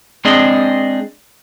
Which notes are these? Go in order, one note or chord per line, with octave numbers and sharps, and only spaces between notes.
G#3 C4 D4 G#4 D5 D#5